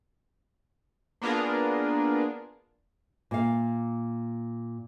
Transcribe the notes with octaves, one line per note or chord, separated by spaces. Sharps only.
A#3 B3 D4 F4 G#4 A#4
A#2 F5